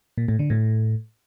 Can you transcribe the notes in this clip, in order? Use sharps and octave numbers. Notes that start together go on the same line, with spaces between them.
A#2
A2
D3
A2